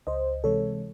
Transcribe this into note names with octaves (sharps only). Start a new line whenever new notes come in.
C#2 C5 D#5
C3 E3 G#3 A4 C#5